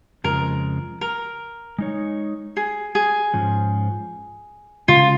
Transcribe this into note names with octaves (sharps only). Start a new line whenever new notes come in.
F2 C#3 F3 G#3 A#4
A#4
G#3 D#4 C#5
G#4
G#4
G#2 F3 C#4
C#3 G#3 C#4 F4